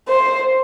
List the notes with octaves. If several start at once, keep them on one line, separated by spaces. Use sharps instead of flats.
C5